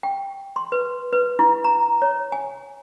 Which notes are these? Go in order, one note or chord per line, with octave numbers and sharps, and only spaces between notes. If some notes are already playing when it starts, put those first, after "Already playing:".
G5
C6
B4
B4
E4
A#5
C#5
G#5